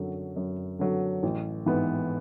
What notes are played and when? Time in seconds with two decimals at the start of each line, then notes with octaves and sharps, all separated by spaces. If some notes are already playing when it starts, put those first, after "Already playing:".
Already playing: F#2 D3 F#3
0.36 F#2
0.79 D3 F#3
1.23 A1
1.66 G#2 E3 B3